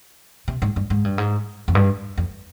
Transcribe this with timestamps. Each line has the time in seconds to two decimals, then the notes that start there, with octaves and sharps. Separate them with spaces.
0.48 C3
0.62 G#2
0.76 G2
0.90 G#2
1.05 G2
1.18 G#2
1.68 F2
1.75 G2
2.18 F2